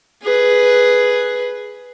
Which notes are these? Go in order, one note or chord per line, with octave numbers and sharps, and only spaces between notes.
G#4 B4